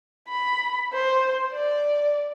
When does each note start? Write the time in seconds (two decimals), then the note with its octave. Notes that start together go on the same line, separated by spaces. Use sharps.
0.28 B5
0.93 C5
1.53 D5